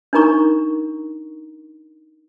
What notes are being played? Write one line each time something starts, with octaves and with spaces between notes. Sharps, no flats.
D4 D#4 A#4 A#5 C#6